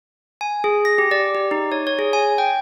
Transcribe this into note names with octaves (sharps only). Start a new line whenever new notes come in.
G#5
G#4
A#6
G4
D5
G4
D#4
C#5
C#5
G#4
G#5
G5